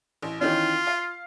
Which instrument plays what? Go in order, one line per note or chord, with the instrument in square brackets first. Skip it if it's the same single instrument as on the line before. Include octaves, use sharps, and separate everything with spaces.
[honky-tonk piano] A1
[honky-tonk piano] D#3 E3 C#4 [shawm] F4
[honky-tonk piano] F5